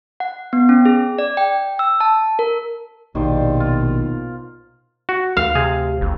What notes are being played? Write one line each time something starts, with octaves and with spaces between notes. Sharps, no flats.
F#5
B3
C#4
G#4
D5
G5
E6
A5
A#4
A#1 D#2 B2 D#3 C5 D5
F4
F#4
D2 F5
C3 G#4
G1